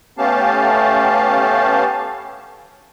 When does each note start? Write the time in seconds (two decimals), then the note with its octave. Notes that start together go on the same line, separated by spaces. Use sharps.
0.18 A3 B3 C#4 G4 F5 A5